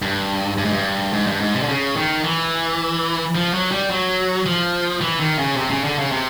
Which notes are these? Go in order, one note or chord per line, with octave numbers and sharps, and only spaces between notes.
G2
G2
G#2
G2
G#2
G2
G#2
C3
D3
C#3
D#3
E3
F3
F#3
G3
F#3
F3
E3
D#3
C#3
C3
C#3
D3
C#3
C3